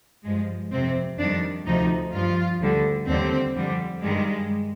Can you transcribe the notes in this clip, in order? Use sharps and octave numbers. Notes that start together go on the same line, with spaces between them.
G2 F3 G#3
F2 C3 F3 C4
F2 D#3 G3 D4
D2 C3 F3 D#4
G2 F3 F4
D2 D3 G3
D#2 D3 G3 C4
F2 D3 G3
G2 D#3 G3 G#3